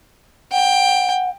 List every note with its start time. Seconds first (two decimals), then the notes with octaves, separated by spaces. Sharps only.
0.52 F#5 G5